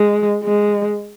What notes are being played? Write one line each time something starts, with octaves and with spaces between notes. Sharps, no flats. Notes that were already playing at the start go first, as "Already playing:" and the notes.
Already playing: G#3
G#3